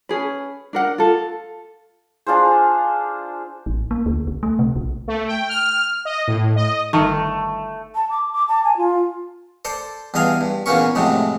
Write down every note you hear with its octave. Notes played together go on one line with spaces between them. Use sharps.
C#4 G#4 B4
D4 A#4 F#5
F4 A4
D4 F4 G#4 C5
A1
A#3
D2
C#2
A3
C3
B1
A3
G5
F6
D#5
A2
D#5
G1 D#3 A3
A5
D6
D6
A5
G#5
F4
A4 C5 D5
E2 G2 D#5 F5 G#5
G2
E2 A#2 E3 A#3 C#4 C#6
F2 A2 C3 F#3 G#3